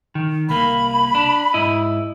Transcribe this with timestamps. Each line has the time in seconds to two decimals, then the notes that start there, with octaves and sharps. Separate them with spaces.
0.15 D#3
0.49 C2 A#3 B5
1.15 D4
1.54 G#2 E4 D#5